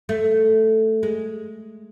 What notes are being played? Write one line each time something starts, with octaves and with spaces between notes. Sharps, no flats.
A3
G#3